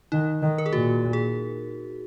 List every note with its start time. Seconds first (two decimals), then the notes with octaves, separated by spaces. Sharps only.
0.12 D#3 D#4
0.42 D#3
0.58 A#4
0.66 G#4
0.72 A#2 F#4
1.13 G#4